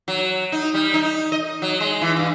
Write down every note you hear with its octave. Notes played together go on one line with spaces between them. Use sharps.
F#3
D#4
G3
D#4
D#5
F#3
G#3
E3
G2